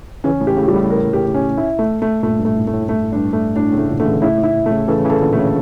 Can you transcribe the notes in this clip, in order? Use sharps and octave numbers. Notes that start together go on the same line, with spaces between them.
C#3 E3 C#4
A2
G4
A2 C#3
G3
A2
A2 A#4
G4
C#4
E4
A3
A3
G2 A#2 A3
G2
A3
A2
A3
A2
G2 A3
A2
G2 D4
A3
A2 D4
A2 C#3
A3
A#2 D3
D3 A3
C#3 E3
A2 C#3 E4
A2
E4
A3
A2 C#3
C#3 E3 A4
C#3 E3
A4
A#2 D3
A3
A2 C#3